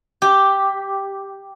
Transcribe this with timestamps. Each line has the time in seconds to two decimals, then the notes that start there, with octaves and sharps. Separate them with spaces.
0.22 G4